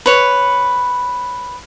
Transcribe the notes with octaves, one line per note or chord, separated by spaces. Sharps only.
B4 C#5